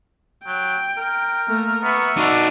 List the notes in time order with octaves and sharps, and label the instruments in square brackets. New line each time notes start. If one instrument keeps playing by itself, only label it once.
[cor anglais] F#3 [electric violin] G5
[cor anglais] A#4
[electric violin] A3 A#3
[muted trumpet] B3 [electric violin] E5 C#6
[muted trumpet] D4 [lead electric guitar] D#4 F#4